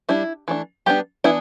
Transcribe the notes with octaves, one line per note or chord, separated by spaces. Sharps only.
G3 D4 E4
E3 A3 D4
G3 B3 D4 G4
E3 B3 D4 E4